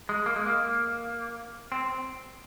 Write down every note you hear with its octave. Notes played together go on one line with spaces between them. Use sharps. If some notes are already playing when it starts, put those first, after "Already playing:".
G#3
A#3
G#3
A#3
C4